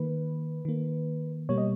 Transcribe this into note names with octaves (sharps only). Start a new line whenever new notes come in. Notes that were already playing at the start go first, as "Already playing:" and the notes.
Already playing: D#3 A#3 B4
D#3 A#3
B2 G3 A#3 C#5
D#5